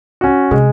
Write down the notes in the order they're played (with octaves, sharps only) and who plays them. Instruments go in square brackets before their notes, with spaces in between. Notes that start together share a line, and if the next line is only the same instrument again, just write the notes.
[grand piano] C#4 F#4
[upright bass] C3 [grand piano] G#3